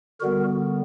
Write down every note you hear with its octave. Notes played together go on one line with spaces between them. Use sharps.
D3 G3 B3 F#4 A#4